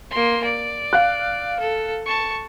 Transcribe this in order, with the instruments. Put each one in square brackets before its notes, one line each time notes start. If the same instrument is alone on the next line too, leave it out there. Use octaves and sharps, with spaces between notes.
[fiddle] A#3 C6
D5
[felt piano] F5 F#6
[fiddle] A4
A5 C#6